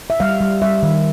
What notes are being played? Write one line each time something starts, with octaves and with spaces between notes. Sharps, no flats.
E5
G3 F5
G3
G3 E5
D#3